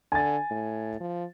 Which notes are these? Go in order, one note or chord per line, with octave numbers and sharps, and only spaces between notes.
D3 G#5 A6
A2
F3